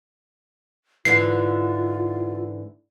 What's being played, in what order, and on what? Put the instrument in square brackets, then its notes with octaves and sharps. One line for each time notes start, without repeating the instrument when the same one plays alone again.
[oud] G#2 D3 E3 [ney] F4 [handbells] C7